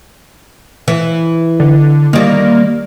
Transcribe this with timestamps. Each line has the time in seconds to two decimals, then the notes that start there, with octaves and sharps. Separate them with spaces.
0.88 E3
1.60 D3
2.13 D#3 G3 A#3